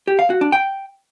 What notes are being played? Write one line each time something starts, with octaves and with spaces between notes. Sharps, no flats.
G4
F5
F#4
D4
G5